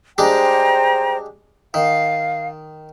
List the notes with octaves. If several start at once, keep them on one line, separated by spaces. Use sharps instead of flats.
G3 G#3 D4 C5 G5 A#5
D#3 F5